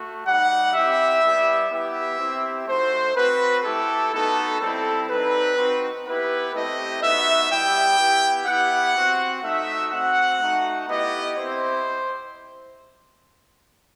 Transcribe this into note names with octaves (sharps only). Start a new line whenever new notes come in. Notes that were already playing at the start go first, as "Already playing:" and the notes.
Already playing: A3 F#4
G3 D#4 G4 F#5
C4 E4 G4 E5
G3 B3 E4 G4
B3 E4 G4 E5
C4 E4 G4
A3 D#4 F#4 C5
C4 F#4 B4
A3 E4 G4 A4
B3 D#4 F#4 A4
G3 C4 E4 A4
G3 C4 D#4 B4
C4 D#4 F#4
B3 E4 G4 B4
A3 C4 E4 G4 D#5
B3 D#4 F#4 E5
G3 B3 E4 G4 G5
B3 E4 G4
B3 E4 G4 F#5
C4 F#4
A3 D#4 F#4 E5
C4 F#4 F#5
A3 D#4 F#4
B3 E4 G4 D#5
C4 E4 G4 C5